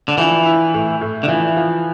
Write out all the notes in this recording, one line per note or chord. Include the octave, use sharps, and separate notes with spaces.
D3
E3 F3
E4
A2
A2
D3
E3 F3
F3